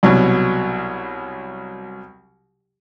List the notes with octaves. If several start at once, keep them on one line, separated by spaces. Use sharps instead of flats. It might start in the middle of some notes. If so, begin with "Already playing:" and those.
C2 B2 F#3